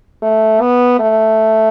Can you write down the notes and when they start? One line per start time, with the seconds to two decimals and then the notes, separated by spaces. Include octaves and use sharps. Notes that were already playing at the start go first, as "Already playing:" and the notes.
0.22 A3
0.61 B3
0.99 A3